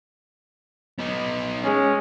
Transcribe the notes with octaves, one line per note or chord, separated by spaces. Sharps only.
B3 D#4
G#3 C#4